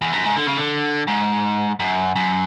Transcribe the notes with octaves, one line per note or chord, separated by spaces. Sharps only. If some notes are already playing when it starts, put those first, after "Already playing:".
E2
F#2
G#2
D3
C#3
D3
G#2
F#2
F#2